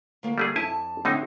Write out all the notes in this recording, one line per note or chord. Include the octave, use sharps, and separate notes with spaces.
D2 A#3
G3 A3 G#4
F2 E4 G#5 A5
A2 D3 C4 D#4